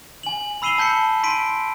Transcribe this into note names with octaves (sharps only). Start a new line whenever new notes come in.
G#5 F#7
B5 E6 C7 D#7 E7 G7
A5 G6 B6 C#7
C6 B6 D7 D#7